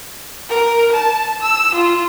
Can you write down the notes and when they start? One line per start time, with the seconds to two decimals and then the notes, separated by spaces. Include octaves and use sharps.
0.49 A#4
0.92 A5
1.42 E6
1.75 F4